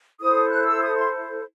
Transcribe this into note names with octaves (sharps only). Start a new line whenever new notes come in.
E4 A4 C5 D#6
F#6
E6
D#6
C6